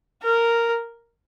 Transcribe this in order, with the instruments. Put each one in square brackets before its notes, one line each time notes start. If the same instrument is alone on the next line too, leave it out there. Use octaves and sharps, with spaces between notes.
[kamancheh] A#4